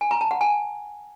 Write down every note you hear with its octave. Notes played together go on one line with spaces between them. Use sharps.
G#5
A#5
A5
F#5
G#5